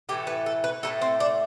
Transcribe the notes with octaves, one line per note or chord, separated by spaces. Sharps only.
A2 E3 A3 G4
B4
A4
B4
A2 E3 A3 A4
C4
D4